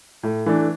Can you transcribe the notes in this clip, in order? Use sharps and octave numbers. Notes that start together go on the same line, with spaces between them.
A2
E3 A3 D4